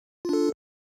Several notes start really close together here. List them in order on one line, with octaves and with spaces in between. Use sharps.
F4 D4 A4